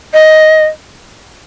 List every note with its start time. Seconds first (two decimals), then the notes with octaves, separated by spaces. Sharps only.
0.14 D#5